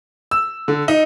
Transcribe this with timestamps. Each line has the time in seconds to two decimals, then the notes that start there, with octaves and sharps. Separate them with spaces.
0.31 E6
0.68 D3
0.88 D#4